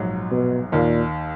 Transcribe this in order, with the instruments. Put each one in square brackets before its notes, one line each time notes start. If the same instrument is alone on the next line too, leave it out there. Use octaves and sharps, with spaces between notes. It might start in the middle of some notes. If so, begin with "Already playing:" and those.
Already playing: [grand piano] A#1 G#2 F#3
[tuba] B2
[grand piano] D#2 D#3 A#3 [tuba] A#2